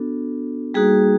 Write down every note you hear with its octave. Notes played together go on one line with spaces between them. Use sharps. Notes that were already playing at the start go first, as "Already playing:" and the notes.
Already playing: B3 D4 F#4 A4
G3 A#3 D#4 F#4 G#4